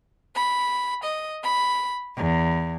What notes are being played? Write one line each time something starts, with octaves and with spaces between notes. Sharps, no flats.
B5
D#5
B5
E2